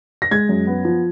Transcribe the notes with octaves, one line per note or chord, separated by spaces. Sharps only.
A#6
G#3 G#6
F#2
B3
F3